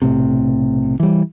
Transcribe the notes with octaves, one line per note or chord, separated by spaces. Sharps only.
B1 A2 C3
E3 G3